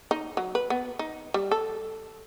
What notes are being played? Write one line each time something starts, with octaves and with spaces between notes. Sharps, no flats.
D#4
F#3
B4
B3
D#4
G3
A4